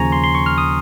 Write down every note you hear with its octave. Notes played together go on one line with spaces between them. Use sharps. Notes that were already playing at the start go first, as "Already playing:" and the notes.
Already playing: D#2 C#3 F3 G#5 A#5 C#6
C6
C6
C#6
F6
D#6